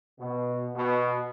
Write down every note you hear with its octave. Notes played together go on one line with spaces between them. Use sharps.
B2
B2